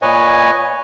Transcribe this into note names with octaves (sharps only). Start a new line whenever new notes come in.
A#2 B4 C#5 D#5 G#5